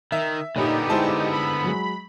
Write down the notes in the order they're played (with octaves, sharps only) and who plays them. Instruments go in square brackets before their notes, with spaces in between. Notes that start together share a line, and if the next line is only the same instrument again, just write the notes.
[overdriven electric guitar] D#3 [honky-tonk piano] E5
[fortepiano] A#2 C#5 B5 [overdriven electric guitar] D3 B3 [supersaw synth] D#4 G4
[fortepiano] G#3 [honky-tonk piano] E4 C5 A5
[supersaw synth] B5
[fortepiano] F#3 G#3